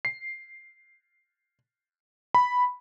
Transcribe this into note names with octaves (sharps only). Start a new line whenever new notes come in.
C7
B5